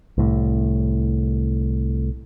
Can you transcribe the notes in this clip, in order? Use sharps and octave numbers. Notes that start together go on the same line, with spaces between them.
C2 A2